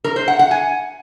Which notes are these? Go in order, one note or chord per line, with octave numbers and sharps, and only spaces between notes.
A#4
C5
F#5
F#5
G#5